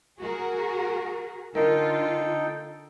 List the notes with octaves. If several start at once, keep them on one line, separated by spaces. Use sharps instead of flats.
F#4 G#4 A#4
D3 D#4 F4 A4 A#4 G5